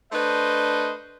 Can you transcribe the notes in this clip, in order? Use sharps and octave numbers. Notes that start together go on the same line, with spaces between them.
A3 D4 B4 C5 D#5